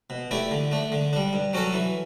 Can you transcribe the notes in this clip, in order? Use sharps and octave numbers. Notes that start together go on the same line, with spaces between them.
B2
A3 E4 G4 D5
D3
A3 D4
D3
G3 D4
G2
F#3 C#4 F#4 A4
E3